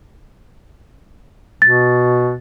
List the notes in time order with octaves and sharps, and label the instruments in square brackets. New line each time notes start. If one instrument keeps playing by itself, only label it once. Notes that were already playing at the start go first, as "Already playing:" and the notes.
[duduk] B2 [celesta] A6